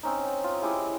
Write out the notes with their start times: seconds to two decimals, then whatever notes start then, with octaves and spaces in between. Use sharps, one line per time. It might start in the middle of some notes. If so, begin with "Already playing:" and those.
0.03 C4 C#4 D#4
0.44 F4
0.62 G#3 E4 G4 D#6